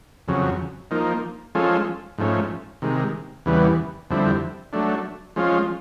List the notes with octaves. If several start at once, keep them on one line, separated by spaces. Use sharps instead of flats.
F2 C#3 F#3
F3 A#3 D#4
F3 G#3 C#4 F4 A4
G#2 F3 A3 C#4
C3 D#3 G#3
E2 C#3 E3 G3 B3
F2 D3 G3 C4 E4
F#3 A3 D4
F3 G#3 C#4 F4